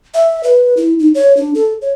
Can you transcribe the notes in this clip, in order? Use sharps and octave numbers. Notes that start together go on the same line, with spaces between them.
E5
B4
E4
D#4
C#5
D4
A4
C#5